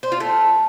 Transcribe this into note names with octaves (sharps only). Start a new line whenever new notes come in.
C5
F4
A3